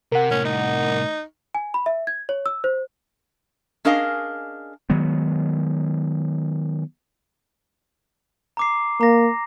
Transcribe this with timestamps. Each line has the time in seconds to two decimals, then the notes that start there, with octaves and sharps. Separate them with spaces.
0.12 C3 A#4 F#5
0.31 C2 A2 C#4
0.45 D#4
1.55 G#5
1.74 B5
1.86 E5
2.07 G#6
2.29 C#5
2.46 E6
2.64 C5
3.85 C#4 D4 G#4 A#4 D#5 F5
4.90 D#3 F#3 G#3 B3
8.57 A#5 D6 C7
9.01 A#3 A#5 A#6